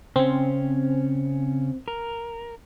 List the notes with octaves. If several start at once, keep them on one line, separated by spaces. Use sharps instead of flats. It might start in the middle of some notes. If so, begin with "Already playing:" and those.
C#3 C4 C#4
A#4